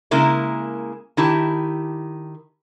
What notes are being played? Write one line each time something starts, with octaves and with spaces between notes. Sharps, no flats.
C#3 G#3 A#3 E4 A#4
D#3 E4 G4 A5